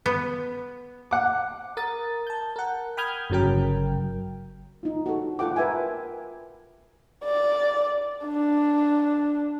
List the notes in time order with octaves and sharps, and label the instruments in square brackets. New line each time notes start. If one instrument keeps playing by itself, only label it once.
[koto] B3
[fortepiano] F#5 D6
[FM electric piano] A#4 D#6 A6
A5 G6
A#4 F#5
G5 B5 D#6 F6 G6 G#6
G1 C#3 F#3 A#4 G5
[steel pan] D#4 F4
F#4 A4
F4 A4 F#5 G5 D6
A#4 B4 E5 G5 G#5
[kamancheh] D5
D4